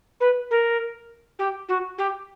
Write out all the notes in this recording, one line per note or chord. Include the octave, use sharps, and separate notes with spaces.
B4
A#4
G4
F#4
G4